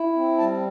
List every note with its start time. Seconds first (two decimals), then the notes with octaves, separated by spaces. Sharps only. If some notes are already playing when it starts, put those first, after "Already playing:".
Already playing: E4
0.15 C4
0.38 G3 A5